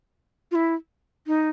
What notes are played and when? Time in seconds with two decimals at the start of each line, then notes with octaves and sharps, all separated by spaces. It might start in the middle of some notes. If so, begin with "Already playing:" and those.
0.51 F4
0.55 E4
1.27 D#4